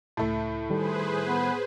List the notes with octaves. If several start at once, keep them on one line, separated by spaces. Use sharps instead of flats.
C#2 A2 A3 E5 A5
D#3 G3 G#4 A4 B4 C5
B3